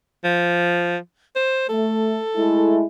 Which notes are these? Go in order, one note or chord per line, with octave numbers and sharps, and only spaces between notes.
F3
C5
A3 A4
G#3 A3 E4